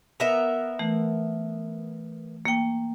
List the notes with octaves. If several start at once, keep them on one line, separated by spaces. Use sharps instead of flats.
B3 A#4 E5
E3 A3
A#3 G5